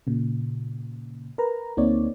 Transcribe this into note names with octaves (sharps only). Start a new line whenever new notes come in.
A#2 C#3
A#4 B4 A#5
D2 A#3 C4 D#4 C#5 D5